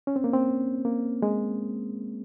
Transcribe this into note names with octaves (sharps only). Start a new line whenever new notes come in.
C#4
C4
A#3
C4
A#3
G#3